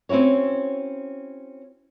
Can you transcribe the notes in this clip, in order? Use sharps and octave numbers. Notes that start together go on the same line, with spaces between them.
C4 C#4 E4 F#4 C#5